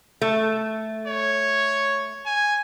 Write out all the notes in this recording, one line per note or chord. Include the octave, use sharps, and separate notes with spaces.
A3
C#5
G#5